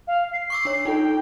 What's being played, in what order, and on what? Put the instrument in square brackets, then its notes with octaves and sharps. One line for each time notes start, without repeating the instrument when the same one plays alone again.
[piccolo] F5
C7
[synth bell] C#6 D6 E6
D4 C#5
[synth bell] D#4 F4 A4 [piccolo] G5